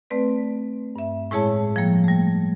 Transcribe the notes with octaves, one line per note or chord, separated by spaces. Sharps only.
A3 C4 B4 D5
G2 E5
A2 G#3 E4 G#4 C#5 A5
F3 G3 A#3
G3 A3